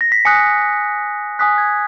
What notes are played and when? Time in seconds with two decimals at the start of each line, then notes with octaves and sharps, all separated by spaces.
0.01 A#6
0.12 B6
0.25 G#5 D#6 F#6 C#7
1.39 G#5 D#6 F#6 B6
1.58 G#6